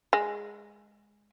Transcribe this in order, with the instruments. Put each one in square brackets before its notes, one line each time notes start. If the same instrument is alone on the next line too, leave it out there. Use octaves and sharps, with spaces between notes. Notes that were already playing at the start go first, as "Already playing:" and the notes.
[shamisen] G#3